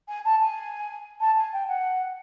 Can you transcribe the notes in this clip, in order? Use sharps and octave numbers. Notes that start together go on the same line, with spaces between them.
G#5
A5
G#5
A5
G#5
G5
F#5